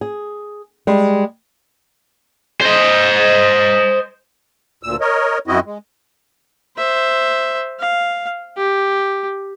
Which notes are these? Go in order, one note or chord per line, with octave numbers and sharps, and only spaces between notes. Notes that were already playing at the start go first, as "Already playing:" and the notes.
G#4
G3 G#3
C5 D#5
D2 A#2 E6
A#4 C#5 D#5
F#2 C4 E4 F#4 D#5
G#3
C5 E5
F5
G4